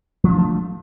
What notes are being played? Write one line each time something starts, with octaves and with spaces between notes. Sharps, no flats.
F3 F#3 A3 D4